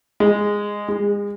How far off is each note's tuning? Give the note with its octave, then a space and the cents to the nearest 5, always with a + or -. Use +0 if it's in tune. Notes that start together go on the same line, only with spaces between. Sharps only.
G#3 -10
G#3 -35